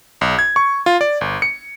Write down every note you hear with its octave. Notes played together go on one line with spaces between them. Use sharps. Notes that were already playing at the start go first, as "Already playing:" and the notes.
B1
G#6
C#6
F4
D5
G1
C#7